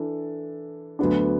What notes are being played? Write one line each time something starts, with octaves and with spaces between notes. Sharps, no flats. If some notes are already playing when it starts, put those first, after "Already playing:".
Already playing: E3 D4 A4
D2 D3 F#3 B3 D4